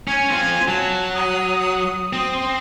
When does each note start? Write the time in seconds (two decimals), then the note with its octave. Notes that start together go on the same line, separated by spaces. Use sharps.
0.08 C#4 G#5
0.31 C4 F4
0.68 F#3 A5
1.14 D#6
2.13 C4 D#6
2.33 C6